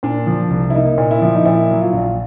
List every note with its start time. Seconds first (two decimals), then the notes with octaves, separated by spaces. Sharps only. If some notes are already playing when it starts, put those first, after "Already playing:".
0.03 A#2 D4
0.27 F3
0.50 C2
0.70 E4
0.74 A#3 D#4
0.98 A#2
1.11 E4
1.22 F3
1.36 D#4
1.45 A#2 E4
1.70 F#3
1.82 F4
1.93 A#1